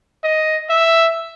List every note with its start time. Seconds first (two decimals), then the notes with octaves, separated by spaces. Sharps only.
0.24 D#5
0.70 E5